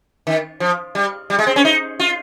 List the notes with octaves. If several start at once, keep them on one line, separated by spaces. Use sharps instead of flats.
D#3
F3
G3
G3
G#3
C4
C#4
D#4
F4